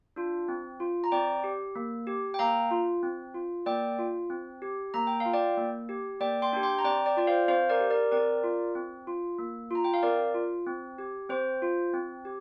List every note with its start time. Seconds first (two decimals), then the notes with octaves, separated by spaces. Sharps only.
0.16 D4 F4
0.48 C4
0.80 F4
1.04 A#5
1.12 C4 D5 G5
1.44 G4
1.75 A#3
2.07 G4
2.34 G5
2.39 A#3 F5 A#5
2.71 F4
3.03 C4
3.34 F4
3.66 A#3 D5 G5
3.99 F4
4.30 C4
4.62 G4
4.94 A#3 A#5
5.07 G5
5.20 F5
5.26 F4
5.33 D5 G5
5.57 A#3
5.89 G4
6.20 A#3 D5 G5
6.42 G5 C6
6.53 D4 G4
6.63 G5 C6
6.78 A#5
6.84 C4 D5 G5
7.06 D5 G5
7.17 F4 D5
7.27 C5 F5
7.48 C4 C5 F5
7.69 A#4 D5
7.80 G4
7.90 A#4 D5
8.12 C4 A#4 D5
8.44 F4
8.75 C4
9.07 F4
9.39 A#3
9.71 F4 A#5
9.84 G5
9.94 F5
10.03 C4 A#4 D5
10.34 F4
10.66 C4
10.98 G4
11.29 C4 C5
11.62 F4
11.93 C4
12.25 G4